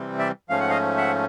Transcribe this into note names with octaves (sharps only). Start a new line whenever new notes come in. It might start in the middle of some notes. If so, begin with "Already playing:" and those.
Already playing: C3 E3 G3 C4
D5 E5
G#2 F3 A3 C#4 F5
F#5
D#5 F5
E5 F#5